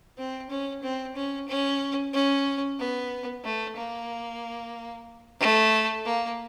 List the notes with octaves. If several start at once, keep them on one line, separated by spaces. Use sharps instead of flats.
C4
C#4
C4
C#4
C#4
C#4
B3
A3
A#3
A3
A#3